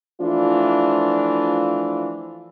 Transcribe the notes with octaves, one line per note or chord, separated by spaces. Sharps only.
E3 F3 A3 D4 F4